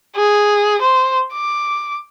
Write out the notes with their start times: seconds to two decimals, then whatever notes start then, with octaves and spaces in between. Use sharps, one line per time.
0.16 G#4
0.81 C5
1.33 D6